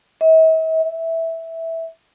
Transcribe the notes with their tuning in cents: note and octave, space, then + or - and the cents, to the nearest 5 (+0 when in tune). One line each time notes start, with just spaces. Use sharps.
E5 -45
E5 -5